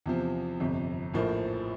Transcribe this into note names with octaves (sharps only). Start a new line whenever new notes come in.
E2 C3 F3
G1 F2 C3
A#1 A2 F3 A#3